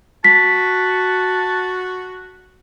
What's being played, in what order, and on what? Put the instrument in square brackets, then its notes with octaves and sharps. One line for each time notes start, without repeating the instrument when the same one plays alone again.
[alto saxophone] F#4 [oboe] A5 [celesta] B6